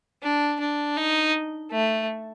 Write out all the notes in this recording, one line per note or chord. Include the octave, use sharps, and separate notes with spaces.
D4
D4
D#4
A3